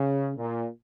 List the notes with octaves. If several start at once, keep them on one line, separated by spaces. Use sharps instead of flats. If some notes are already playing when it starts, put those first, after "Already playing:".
Already playing: C#3
A#2